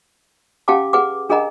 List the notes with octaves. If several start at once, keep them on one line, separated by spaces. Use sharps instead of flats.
C#4 G4 F5 F#5 A5 D6
G#4 B4 F#5 D6
D4 G#4 A#4 D#5 F#5 A#5